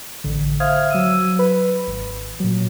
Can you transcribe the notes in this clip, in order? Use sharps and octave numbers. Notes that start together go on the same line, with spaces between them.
A1 D3
C5 E5 F5 D#6 F6 G#6
F#3 E6 D#7
B4 B5
G#1
A#2 F#3